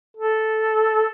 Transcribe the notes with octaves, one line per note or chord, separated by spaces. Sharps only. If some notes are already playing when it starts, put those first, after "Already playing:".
A4